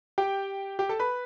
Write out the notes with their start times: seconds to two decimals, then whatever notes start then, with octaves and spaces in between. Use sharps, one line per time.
0.18 G4 G5
0.79 G4 G5
0.89 A4 A5
0.99 B4 B5